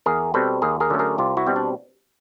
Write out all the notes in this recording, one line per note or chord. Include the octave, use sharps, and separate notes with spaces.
E2 G#4 A#4
B2 G3 C4 A4 B4
D#2 G#4 A#4
G#4 A#4
D3 F#3 A3 C#4
G#4 A#4
C2 F4 G4
E4 F#4
B2 G3 C4
D4